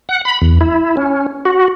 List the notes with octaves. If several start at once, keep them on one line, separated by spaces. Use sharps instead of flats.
F#5
B5
E2
E4
C#4
F#4